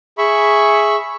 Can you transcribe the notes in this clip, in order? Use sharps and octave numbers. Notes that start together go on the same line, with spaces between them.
G#4 E5 B5 C#6